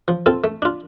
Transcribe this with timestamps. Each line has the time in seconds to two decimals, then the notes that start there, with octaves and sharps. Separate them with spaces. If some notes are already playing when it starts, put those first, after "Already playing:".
0.08 F3
0.26 C4 F4 A4
0.44 A3
0.62 D4 F4